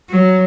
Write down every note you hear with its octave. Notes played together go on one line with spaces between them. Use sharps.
F#3